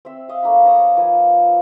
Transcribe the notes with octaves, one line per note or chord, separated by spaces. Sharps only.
C4 E5
D#5 F5
A3 A#3 D#4 B5
C5 C#5 D#5 A#5
F3 A#3 B4 G#5